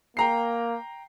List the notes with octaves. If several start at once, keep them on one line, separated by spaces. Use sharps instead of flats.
A#3 G5 A#5 C7